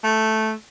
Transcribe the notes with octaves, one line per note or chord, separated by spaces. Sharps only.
A3